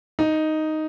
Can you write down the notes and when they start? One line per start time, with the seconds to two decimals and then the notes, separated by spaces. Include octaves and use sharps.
0.19 D#4